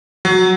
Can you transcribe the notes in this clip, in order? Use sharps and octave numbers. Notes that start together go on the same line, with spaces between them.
F#3